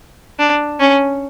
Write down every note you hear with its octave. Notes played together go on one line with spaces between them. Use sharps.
D4
C#4